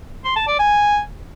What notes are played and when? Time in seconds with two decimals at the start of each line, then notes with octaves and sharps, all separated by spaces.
0.25 C6
0.36 A5
0.47 D5
0.59 G#5